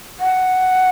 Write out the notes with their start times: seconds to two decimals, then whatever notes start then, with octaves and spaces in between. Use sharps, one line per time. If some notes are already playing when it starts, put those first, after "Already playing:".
0.20 F#5